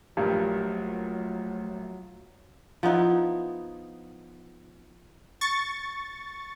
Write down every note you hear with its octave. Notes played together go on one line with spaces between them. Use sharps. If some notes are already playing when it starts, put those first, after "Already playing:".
A#1 G2 F#3 A3 A#4
F3 B3 D#4 E4
C#6 A6